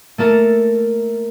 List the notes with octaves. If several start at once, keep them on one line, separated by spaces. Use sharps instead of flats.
A3 A#3 A4 A#4